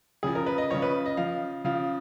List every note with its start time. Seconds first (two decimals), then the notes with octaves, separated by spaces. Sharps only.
0.23 C#3 F3 G#4
0.35 A#4
0.46 B4
0.58 D#5
0.70 C#3 F3 C#5
0.82 B4
1.06 D#5
1.17 C#3 F3 F5
1.64 C#3 F3 F5